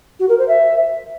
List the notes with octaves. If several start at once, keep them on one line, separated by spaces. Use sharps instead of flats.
F#4
A#4
C5
E5